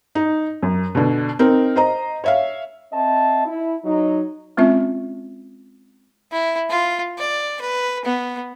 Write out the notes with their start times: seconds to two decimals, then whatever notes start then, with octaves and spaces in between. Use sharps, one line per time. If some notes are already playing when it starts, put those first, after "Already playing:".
0.15 D#4
0.63 F#2
0.95 B2 D3
1.39 C4 D#4 A#4
1.76 C5 D#5 A#5
2.24 C#5 E5 F5
2.93 C4 D#5 E5 A5
3.46 E4
3.84 F#3 D#4
4.57 G#3 C4 C#4 F4 E5
6.32 E4
6.69 F4
7.18 D5
7.61 B4
8.04 B3